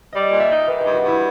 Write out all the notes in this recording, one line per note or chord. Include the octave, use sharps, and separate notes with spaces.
G3 D#5
A#2
E5
D#4
D#3 B4
G2 G#4
F#4
G2 E4